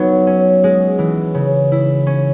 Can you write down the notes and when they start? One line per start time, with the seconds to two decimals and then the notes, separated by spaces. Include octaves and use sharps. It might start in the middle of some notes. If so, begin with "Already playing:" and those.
Already playing: F#3 B3 D#4
0.27 C#4
0.64 G#3
0.99 E3
1.35 C#3
1.72 E4
2.07 C#4